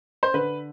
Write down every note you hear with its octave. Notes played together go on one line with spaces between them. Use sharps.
C5
D3 B4